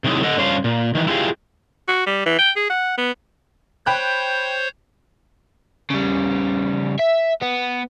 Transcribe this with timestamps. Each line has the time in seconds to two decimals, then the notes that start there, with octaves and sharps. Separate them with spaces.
0.04 C3 D#3 F#3 G#3 D#4 E4
0.23 A4 D#5 F#5
0.37 G2 C#4 C5 F5
0.64 A#2
0.95 D#3 E3
1.07 E4 F4 G4 G#4 F5
1.88 F#4
2.06 G3
2.26 E3
2.38 G5
2.56 G#4
2.69 F#5
2.98 B3
3.86 C5 C#5 G5 B5 F#6 G6
5.91 C#3 G3
6.99 E5
7.41 B3